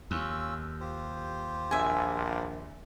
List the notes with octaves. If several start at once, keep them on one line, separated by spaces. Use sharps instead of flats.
D#2 C#4 F4 E6
F4 G4 C5
A#1 E5 G#5